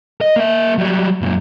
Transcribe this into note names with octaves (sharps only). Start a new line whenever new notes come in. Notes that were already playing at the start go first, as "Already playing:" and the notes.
D#5
A#3 E5
F#3 G3
F#2 A#2